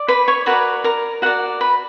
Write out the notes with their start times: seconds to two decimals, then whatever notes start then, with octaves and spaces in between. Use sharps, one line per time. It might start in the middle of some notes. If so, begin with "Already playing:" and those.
Already playing: D5
0.08 B4 B5
0.28 C#5 C#6
0.46 F#4 A#4 B4 D5 B5
0.84 A#4 A#5
1.22 F#4 A#4 D5 F#5
1.61 B4 B5